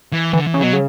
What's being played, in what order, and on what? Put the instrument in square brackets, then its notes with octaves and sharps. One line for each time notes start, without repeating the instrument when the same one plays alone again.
[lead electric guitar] E3
[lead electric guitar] D3 [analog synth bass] E3
[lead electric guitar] E3
[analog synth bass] C#3
[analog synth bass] B2 [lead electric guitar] F#3
[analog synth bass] C#3